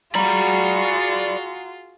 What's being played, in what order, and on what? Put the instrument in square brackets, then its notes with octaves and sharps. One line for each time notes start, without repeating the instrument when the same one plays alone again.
[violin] F4 [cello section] F#4 G#4 [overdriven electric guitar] D5 B5 [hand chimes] A#5